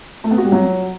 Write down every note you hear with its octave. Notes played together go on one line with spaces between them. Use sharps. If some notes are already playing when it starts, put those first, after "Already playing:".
A3
B3
F#4
G3
F#3